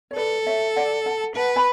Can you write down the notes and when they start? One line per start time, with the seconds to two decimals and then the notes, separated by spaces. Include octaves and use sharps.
0.11 C#5
0.16 A4 B4 D5
0.46 C#5 E5
0.76 D5 F#5
1.06 F#5 A5
1.36 B4 F#5 A5
1.56 G#5 B5